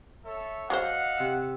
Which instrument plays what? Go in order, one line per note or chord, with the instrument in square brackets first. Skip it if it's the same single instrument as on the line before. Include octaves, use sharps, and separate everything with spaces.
[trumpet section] A4 C#5 E5
[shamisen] F#3 G4 C5 [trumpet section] D#5 F5 [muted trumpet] F#5
[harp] C3 E6